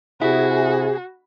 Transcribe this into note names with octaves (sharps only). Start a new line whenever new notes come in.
C3 E4 F#4 G#4